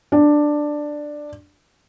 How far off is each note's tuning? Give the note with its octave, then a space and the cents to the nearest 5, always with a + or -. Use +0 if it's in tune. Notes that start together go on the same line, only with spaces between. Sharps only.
D4 +10